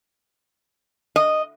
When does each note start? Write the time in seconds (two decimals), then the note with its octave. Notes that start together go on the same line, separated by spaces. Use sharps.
1.16 D#5